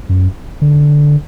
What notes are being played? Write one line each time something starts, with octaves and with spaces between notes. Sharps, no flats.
F#2
D3